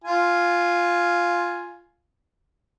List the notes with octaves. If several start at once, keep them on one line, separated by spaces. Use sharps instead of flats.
F4 G#5